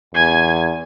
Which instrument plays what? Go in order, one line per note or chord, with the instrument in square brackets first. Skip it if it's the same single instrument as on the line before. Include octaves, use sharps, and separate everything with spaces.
[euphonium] E2 [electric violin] G#5 G#6